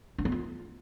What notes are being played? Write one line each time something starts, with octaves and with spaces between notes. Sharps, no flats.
D4
B3
F4